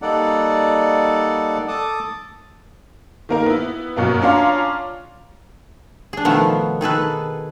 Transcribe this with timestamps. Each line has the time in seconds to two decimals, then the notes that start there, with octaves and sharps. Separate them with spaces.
0.02 G3 A#3 D#4 A4 D5 F#5
1.68 A4 A5 D6 D#6
3.29 D#3 A#3 A#4
3.46 B3 E4
3.96 F#2 B2 A#3 F4
4.22 C#4 D4 F4 F5 A#5 C6
6.13 D4 G#4
6.25 B2 D#3 F3 A3 B3
6.81 D#3 G#4 A4 B4